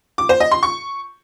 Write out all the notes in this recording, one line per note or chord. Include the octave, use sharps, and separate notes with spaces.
D6
C5
D#5
C6
C#6